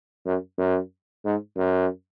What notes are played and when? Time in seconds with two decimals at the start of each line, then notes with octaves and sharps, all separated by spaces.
0.26 F#2
0.58 F#2
1.25 G#2
1.57 F#2